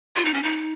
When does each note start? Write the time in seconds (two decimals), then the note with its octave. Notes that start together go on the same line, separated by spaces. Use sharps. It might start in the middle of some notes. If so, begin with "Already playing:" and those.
0.16 F4
0.25 D#4
0.34 C#4
0.43 D#4